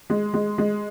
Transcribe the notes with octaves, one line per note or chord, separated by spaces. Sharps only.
G#3
G#3
G#3